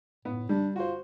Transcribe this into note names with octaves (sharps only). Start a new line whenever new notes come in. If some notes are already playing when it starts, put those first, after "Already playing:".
A2 B3
G3 D4
F4 F#4 C5